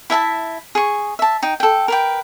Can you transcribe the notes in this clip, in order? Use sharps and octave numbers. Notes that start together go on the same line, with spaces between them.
E4 E5 G#5 A5
G#4 C#6
E5 A5
D#4 G5
A4 G5
A#4 B4 G5